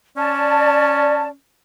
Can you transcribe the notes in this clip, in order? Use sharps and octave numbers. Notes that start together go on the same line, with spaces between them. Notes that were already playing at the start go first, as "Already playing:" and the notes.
C#4 D5 A5